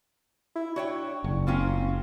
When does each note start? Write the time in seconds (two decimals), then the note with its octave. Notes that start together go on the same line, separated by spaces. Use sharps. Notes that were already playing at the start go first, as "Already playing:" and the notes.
0.55 E4
0.76 D4 F#4 C#5 G5
1.24 F#1
1.47 A#3 C4 C#4 F4